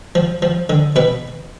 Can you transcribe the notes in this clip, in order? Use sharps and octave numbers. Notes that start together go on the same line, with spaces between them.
F3
F3
D3
B2 B4